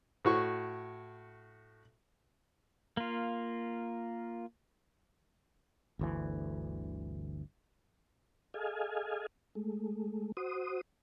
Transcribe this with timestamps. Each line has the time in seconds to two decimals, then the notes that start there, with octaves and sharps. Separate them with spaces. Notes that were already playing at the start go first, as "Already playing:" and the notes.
0.25 A2 F#4 C#6
2.97 A#3 F4
5.99 G1 D2 E3
8.54 G#4 A4 D#5 F5 G#5
9.55 G#3 A3
10.37 F#4 C5 D#6